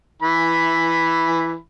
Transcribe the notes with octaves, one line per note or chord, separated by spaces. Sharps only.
E3 B5